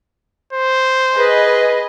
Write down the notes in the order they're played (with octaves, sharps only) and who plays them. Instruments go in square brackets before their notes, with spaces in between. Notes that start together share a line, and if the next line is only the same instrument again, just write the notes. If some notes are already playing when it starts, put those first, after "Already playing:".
[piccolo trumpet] C5
[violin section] G#4 B4 D#5